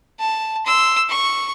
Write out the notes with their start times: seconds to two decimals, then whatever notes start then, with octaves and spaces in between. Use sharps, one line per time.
0.19 A5
0.66 C6 E6
1.09 C#6